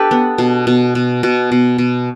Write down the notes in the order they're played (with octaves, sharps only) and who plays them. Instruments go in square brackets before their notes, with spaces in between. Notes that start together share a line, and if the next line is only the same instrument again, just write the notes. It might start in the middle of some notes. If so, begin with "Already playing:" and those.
Already playing: [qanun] D4 G4 A4 B4
B3
B2
B2
B2
B2
B2
B2